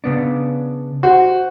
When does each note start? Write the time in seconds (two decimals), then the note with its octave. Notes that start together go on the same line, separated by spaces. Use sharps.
0.04 C#3 B3 D4
1.03 F#4 C5